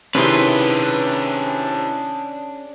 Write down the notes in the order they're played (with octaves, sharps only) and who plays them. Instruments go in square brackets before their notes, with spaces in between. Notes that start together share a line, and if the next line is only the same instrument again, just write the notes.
[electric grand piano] C3 D#3 E4 [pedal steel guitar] C#4 C6 [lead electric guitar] D4 G#4 [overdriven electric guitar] B4